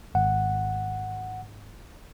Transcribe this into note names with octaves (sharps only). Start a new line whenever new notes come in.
G#1 F#5